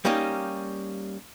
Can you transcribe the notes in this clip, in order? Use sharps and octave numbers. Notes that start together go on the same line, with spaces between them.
G3 A#3 C#4 D#4 G4